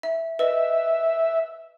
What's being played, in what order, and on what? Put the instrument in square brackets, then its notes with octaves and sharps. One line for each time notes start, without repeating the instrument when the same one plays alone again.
[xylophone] E5
[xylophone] B4 D#5 [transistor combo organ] E5